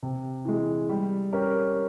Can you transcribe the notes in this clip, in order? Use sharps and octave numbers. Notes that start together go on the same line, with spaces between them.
C3
E3 G#3
G3
C#4 G4 A#4